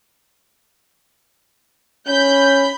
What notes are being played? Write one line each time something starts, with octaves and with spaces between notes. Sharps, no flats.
C#4 B5 G6